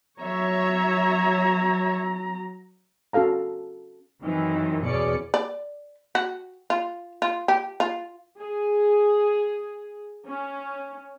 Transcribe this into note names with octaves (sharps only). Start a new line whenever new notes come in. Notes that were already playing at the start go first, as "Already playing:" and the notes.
F#3 C#5 E5 A#5
C#4 F#4 A4 F5 A#5
F#2 D#3 E3 C4
E2 B2 C#4 G#4 D5 C#7
D5
F#4
F4
F4
G4
F4
G#4
C#4